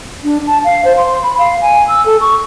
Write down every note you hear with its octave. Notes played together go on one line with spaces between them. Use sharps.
D4
A5
F5
C5
C6
B5
F5
G#5
E6
A4
C#6